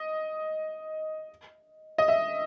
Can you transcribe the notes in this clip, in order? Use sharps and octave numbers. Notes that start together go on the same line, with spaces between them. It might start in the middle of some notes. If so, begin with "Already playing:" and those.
Already playing: D#5
D#5
E5